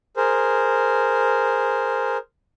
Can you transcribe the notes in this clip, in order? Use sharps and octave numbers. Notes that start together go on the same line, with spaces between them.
G#4 A#4 C5